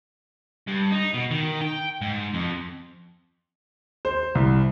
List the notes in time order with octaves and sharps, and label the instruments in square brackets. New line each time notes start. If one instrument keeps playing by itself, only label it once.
[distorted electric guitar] G2
D#4
B2
D#3
G5
G#2
F2
[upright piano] C5
C2